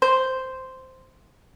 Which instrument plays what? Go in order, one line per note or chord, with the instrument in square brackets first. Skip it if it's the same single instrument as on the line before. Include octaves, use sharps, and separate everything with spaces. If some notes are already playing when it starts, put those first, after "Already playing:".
[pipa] C5